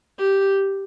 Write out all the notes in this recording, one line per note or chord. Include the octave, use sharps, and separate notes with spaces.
G4